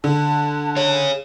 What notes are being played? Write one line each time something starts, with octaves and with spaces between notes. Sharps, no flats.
D3 A5
G#4 C#5